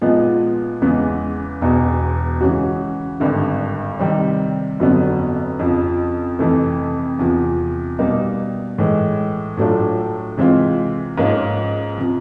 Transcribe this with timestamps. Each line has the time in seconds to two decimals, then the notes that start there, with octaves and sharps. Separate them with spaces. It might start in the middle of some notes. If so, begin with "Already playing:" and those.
0.02 A#2 F3 G#3 B3 D#4
0.82 E2 C#3 E3 G#3 B3
1.61 E1 E2 B2
2.41 C#3 E3 G#3 C#4 F#4
3.20 G#1 G2 D3
3.99 C3 D#3 G3 C4
4.79 G1 F2 D3 F#3 B3
5.59 F2 C#3 F3
6.39 F2 C3 E3 A3
7.19 E2 C3 F3
7.99 B2 G3 A#3 D#4
8.78 A2 E3 G#3
9.57 A2 F#3 A3 D4 F4
10.38 C3 E3 G#3 C4 F4
11.18 G#2 F3 A#3 C#4 F4
11.98 C3 F3